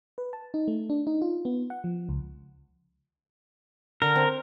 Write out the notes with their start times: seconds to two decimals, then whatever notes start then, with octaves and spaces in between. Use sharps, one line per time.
0.18 B4
0.33 A5
0.54 D#4
0.68 A3
0.90 D4
1.07 D#4
1.22 F4
1.45 B3
1.70 F#5
1.84 F3
2.09 C#2
4.02 D3 A#4
4.16 C4